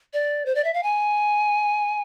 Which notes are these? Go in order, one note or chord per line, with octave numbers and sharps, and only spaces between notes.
D5
C5
D5
E5
F5
G#5